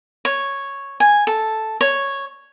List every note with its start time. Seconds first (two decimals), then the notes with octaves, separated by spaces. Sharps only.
0.25 C#5
1.00 G#5
1.27 A4
1.81 C#5